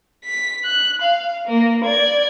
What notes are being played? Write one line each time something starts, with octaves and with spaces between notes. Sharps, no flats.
B6
F#6
F5
A#3
D5 G#6